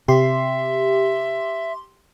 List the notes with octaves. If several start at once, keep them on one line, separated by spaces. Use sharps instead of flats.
C3 G4 E5 C6